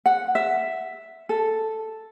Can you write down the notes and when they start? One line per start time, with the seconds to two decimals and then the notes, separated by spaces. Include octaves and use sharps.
0.06 F#5
0.35 E5
1.29 A4